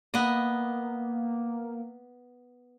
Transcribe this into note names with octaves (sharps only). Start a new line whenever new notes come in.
A#3 B3 D#5